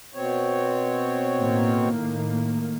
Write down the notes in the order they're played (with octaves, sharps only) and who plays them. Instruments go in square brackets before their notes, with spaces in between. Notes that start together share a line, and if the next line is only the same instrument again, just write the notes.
[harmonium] B2 C4 C#5
[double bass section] A2 D#3 A#3